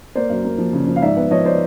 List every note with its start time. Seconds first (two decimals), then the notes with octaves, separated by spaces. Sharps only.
0.15 A#3 C5 D5
0.29 F#2
0.44 A#3
0.58 F3
0.73 C#3
0.87 F3
0.96 F5
1.02 G#2 D5 E5
1.16 B3
1.31 F3 C#5 D#5
1.45 C5 D5